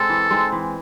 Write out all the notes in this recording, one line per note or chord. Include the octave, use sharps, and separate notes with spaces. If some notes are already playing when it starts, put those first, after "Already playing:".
Already playing: G#3 C4 A4
E3
G#3 C4 D#4
E3